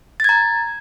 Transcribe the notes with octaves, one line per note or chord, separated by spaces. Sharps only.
A#5 G#6 A6